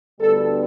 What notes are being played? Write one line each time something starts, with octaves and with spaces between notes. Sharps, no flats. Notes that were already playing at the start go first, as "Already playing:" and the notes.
D2 D3 G3 B3 A4